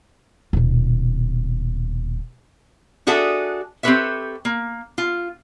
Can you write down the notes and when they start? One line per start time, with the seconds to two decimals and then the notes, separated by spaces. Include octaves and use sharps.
0.53 D#1 B2
3.07 D4 F#4 G#4 A4 E5
3.83 C4 G4 A4 B4 C#5 E5
4.45 A#3
4.98 F4